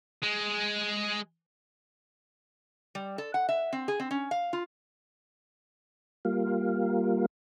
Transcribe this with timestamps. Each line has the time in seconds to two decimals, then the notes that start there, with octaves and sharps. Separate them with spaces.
0.22 G#3
2.95 G3
3.18 A4
3.34 F#5
3.49 E5
3.73 C4
3.88 G#4
4.00 C4
4.11 C#4
4.31 F5
4.53 F4
6.25 G3 A#3 F4